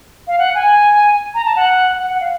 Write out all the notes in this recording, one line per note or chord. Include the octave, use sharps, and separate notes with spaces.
F5
F#5
G#5
A#5
A5
F#5
F#5
F#5
F5